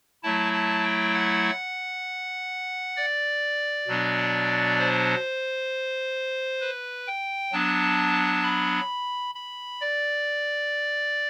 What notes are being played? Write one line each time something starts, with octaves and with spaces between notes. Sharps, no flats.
F#3 A3 E4 A5
A5
G5
F#5
D5
B2 F#3 B3 D4
C5
B4
G5
F#3 B3 D4 A5
B5
B5
D5